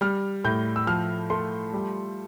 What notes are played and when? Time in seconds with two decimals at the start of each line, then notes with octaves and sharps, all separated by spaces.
0.01 G3 F6
0.44 A2 G6
0.76 E6
0.87 F3 F6
1.30 A3 C6
1.73 G3